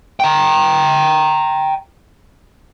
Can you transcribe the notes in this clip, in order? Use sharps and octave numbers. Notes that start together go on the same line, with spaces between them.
G5 A#5